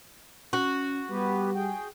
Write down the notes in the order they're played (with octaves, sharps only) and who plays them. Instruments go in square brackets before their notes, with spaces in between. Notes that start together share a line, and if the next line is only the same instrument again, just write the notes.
[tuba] C#4 [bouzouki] F#4
[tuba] G3 [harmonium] B3 G4 B4
[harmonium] G#4 G5